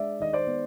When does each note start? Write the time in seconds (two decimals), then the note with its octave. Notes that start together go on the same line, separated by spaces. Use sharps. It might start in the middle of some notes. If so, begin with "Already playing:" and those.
Already playing: G#3 D4 D5 E5
0.20 D#3 D#5
0.33 C5 D5
0.47 B3